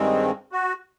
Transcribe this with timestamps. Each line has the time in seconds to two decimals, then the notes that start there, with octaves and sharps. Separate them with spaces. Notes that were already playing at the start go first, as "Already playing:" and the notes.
Already playing: G2 D#3 G#3 C4
0.52 F#4